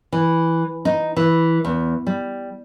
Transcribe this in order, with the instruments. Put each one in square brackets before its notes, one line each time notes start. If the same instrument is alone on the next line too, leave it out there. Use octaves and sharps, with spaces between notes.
[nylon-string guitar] E3
D#4
E3
E2
G3